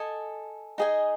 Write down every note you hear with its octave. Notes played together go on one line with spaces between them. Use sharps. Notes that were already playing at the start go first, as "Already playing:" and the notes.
Already playing: A4 D#5 G#5
D#4 G#4 D#5 G#5